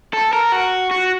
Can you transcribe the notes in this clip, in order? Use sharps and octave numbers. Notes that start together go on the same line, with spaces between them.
A4
A#4
F#4
F#4